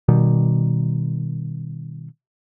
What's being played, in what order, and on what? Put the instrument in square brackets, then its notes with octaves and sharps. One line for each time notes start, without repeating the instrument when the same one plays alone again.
[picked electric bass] B2 D#3 G3